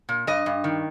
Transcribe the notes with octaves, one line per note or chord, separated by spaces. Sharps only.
A#2
G2 D#5
G2
D#3